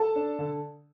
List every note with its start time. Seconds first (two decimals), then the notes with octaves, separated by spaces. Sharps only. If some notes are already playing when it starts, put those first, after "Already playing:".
Already playing: A4 A5
0.15 D4
0.39 D3